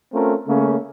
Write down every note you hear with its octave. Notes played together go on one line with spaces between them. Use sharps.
A3 C4 C#4 F4 A#4
C#3 A3 A#3 C#4